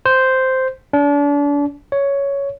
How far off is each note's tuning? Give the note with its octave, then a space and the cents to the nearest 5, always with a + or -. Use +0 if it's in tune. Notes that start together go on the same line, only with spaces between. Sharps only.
C5 -5
D4 -35
C#5 +10